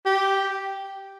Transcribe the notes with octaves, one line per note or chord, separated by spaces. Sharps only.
G4